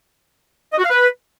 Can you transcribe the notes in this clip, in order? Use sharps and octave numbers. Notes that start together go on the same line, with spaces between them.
D#5
F#4
F5
B4